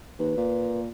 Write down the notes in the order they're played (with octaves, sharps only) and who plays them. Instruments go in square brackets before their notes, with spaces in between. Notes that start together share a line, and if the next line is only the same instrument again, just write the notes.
[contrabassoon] D#2 [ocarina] B4
[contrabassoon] A#2